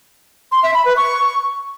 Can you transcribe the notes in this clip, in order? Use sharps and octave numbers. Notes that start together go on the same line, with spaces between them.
C6
E5
B5
B4
C#6